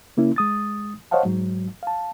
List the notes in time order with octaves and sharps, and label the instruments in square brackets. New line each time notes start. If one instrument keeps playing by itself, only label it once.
[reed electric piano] C#3 A#3 C#4 E4
G#3 D#6 A6
C5 C#5 D#5 F5 F#5 A5
G#2 F#3
F5 A5